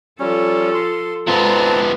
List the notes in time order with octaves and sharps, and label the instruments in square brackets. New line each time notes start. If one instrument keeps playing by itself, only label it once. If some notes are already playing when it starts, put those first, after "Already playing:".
[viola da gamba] F3 F4 A4 [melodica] G3 C#4
[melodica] C6
[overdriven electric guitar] F3 B3 [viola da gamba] G#3 [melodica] C4 A5 A#5